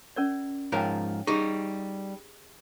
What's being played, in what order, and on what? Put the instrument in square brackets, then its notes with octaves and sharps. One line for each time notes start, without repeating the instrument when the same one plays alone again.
[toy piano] C#4 A#4 D5
[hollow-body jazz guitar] G#2 F3 A#4 [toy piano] C#5 G5
[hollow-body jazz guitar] G3 D#4 [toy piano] G4 G#4